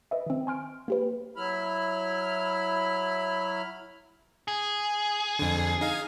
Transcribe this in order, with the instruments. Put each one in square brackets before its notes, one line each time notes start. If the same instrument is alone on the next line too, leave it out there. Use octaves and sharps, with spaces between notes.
[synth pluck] B4 D#5 E5
D#3 C4
G#5 C6 F6 D7
A#3 G4 B4
[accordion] F#3 E4 B5 F6
[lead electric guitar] G#4
[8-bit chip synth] F2 D3
D#4 F5